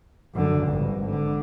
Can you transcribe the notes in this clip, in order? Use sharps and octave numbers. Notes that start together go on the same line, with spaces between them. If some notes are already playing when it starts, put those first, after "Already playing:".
F#2 D3
G#1 G2
D3